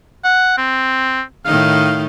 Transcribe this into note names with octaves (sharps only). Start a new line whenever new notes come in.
F#5
C4
A2 D#3 D#4 F5